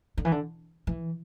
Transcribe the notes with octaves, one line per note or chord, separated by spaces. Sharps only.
D3
E3
D3
E3